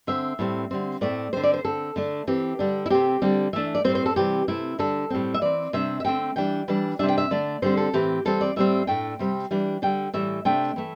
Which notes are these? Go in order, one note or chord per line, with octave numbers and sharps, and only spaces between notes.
D3 C4 E5
A2 G3 C4
D3 G3 C4
A2 A3 C4 D5
D3 C4 C5
D5
C5
D3 C4 A4
D3 A3 D4
E3 C4 G4
D3 G3 D4
E4
C3 A3 C4 G4
D3 G3 C4
E3 A3 D4 E5
D5
A2 G3 C4 C5
C5
A4
C3 E3 G3 C4 G4
C3 A3 C4 E4
D3 G3 D4 A4
A2 G3 C4
E5
E3 C4 D5
C3 G3 D4 E5
E5
D3 A3 C4 G5
E3 G3 D4 G5
E3 G3 D4
C3 G3 D4 E5
G5
E5
D3 A3 D4 D5
D3 G3 C4 C5
A4
A2 E3 C4 G4
E3 G3 C4 A4
D5
A2 G3 C4 E5
A2 A3 D4 G5
C3 G3 C4
E3 G3 D4
D3 G3 D4 G5
A2 E3 G3 E5
C3 A3 D4 G5
E3 A3